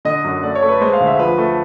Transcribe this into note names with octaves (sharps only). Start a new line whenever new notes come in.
D3 D#5
F#2
A3 D5
C#5
A3
B4
G#3 C5
F5
D2
E5
F3 B4
A3